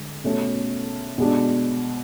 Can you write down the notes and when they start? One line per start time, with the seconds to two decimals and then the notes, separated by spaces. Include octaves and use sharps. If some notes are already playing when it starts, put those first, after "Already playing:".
Already playing: D3 G#3
0.24 B2 A3 C#4
1.18 B2 G#3 D4